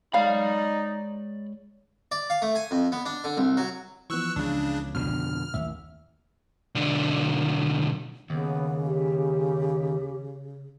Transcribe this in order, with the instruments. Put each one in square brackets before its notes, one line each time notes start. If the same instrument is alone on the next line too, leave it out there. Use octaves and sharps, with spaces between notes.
[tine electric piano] G#3 C#5 [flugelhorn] D#4 [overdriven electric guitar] D5 B5 [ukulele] F5
[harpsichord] D5
F5
A3
G#5
F2
B3
D4
D3
C2
F#3
[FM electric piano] E3 F3 B3 [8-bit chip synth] C#6 E6 F#6
[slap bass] C#2 C#4 [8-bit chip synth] C#3 D4
[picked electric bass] F2 B2 D3 [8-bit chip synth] F6
[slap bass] A1 D#2 [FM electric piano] E5
[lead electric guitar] B1 D3
[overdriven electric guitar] D#2 [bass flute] C#3 [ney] B3
[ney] G4